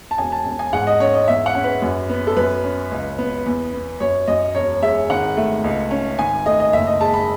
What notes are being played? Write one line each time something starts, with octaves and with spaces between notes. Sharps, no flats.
A5
E1 G#5
A5
E1
G#5
G#2 F#5
D#5
C#4 C#5
D#5
E2 E5
F#5
C#4
B4
F#2
B3
A4
F#2 B4
C#4
C#2
B3
E2
B3
F#2 C#5
F#2 D#5
E1 C#5
G#3 E5
G#1 F#5
A3
C#2
C#4
G#1 G#5
A3 D#5
D#5
F#1 E5
D#5
G#3 A5
B5